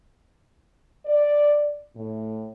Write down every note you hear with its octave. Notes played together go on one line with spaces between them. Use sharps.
D5
A2